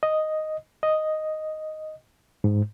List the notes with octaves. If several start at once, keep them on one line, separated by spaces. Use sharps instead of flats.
D#5
D#5
G#2